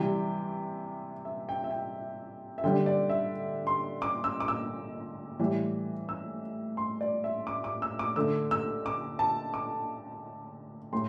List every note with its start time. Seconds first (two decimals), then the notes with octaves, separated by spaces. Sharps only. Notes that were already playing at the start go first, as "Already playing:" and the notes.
Already playing: C3 E3 G3 G5
1.25 E5
1.49 G5
1.64 E5
1.71 G5
2.58 E5
2.64 D3 G3 G5
2.86 D5
3.09 E5
3.67 C6
4.02 D6
4.24 E6
4.40 D6
4.48 E6
5.39 A2 E3 G3
6.09 E6
6.77 C6
7.01 D5
7.24 E5
7.47 D6
7.64 D6
7.82 E6
7.99 D6
8.16 D3 A3 E6
8.51 E6
8.86 D6
9.19 A5
9.54 D6
10.93 A2 C6